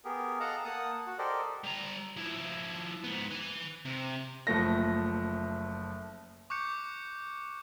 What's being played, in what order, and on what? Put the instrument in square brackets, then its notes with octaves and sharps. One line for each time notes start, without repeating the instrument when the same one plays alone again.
[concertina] B3 G4 G#4 A#4
A4 D#5 F5 F#5 A5 A#5
A#3 F#5 A5 D#6
F#4
G4 A4 A#4 C5 D5 D#5
[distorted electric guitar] G3 A#5
F3 E4
G#2 B3
B4 G#5
C3
[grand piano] F#1 F3 A3 A#6
[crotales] C#6 D6 F#6 G6 C#7